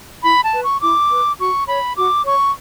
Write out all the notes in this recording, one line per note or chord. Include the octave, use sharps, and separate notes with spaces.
E4 B5
A5
B4
C#6
E4 D6
B4
F#4 C#6
C#5 B5
F#4 D6
C#5 C#6